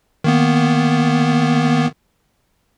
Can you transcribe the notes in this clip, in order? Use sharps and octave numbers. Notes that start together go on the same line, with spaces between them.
D#3 A#3 B3